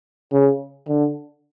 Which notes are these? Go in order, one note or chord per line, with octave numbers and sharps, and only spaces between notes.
C#3
D3